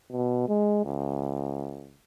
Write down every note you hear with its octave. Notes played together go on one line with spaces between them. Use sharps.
B2
G#3
C#2